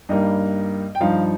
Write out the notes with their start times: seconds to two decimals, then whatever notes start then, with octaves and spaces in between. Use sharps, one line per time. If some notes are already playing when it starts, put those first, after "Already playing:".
0.09 G2 G3 A#3 D#4 D#5
0.95 G5
1.01 G2 F3 D#4 F5